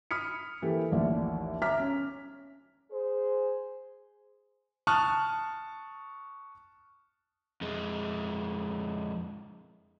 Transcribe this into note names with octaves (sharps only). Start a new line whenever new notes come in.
B5 D#6 F6 B6 C#7
E3 A#3 G4 A4
A1 D#2 F3 D5 E5
E5 A#5 D6 F6 B6
C#4
G#4 C5
A5 C#6 D#6 F6 F#6
F2 G#3